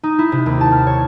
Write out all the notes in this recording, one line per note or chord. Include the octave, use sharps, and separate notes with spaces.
D#4
E4
C3
D#2
A5
F6
C#5